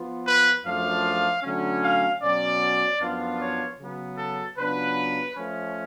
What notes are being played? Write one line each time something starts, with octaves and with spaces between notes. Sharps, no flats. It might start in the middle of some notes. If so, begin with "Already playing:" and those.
Already playing: F3 B3 F4
B4
F#2 F3 A3 D4 F4 F5
D3 F#3 A3 C#4
F5
B2 F#3 C#4 D5
F#2 F3 B3 D4 F4
C#5
C#3 F#3 B3
A4
C#3 F#3 B3 D4 F4 B4
F3 A3 C#4